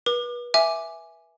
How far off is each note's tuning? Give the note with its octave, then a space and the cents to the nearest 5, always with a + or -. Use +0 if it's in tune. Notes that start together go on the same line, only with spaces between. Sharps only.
B4 -35 D6 +35
E5 +0 G#5 +0 D6 +0